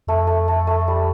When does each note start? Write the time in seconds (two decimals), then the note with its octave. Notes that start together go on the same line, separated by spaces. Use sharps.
0.07 F2 A3
0.27 A3
0.48 A3
0.67 A3
0.88 G3